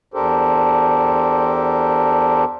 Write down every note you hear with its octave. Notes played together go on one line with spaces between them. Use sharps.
E2 D4 G4 A4 A#4 C5